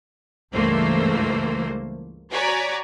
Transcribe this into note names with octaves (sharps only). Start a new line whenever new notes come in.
C#2 G2 E3 A3 A#3 C5
F#4 C#5 D5 G#5 A#5 B6